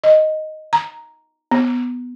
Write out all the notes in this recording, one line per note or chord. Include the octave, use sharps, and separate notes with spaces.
D#5
A#5
B3